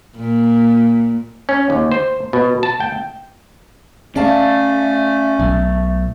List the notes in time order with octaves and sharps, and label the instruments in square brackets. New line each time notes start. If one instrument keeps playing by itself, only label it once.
[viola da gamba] A#2
[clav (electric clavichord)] C#4
D#2
C5
B2
A5
G5
[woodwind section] A3 [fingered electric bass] C#4 [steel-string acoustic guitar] D5 F5 A5
[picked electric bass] B1